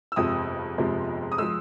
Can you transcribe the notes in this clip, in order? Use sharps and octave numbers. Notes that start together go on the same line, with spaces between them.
E6
G1 F2 C3 F3 G#3 D#6
G1 F2 C3 F3 G#3
D#6
F3 G#3 E6